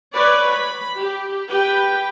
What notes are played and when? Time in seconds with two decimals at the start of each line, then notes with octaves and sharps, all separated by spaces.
0.13 B4 C#5 D5
0.51 B5
0.98 G4
1.51 G4 B4 G5